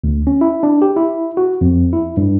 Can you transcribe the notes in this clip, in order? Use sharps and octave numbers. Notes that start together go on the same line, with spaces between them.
D2
C#4
E4
D4
G4
E4
F#4
F2
E4
G2